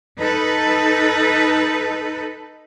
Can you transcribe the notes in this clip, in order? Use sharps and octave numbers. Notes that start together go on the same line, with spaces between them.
D#4 A4 B4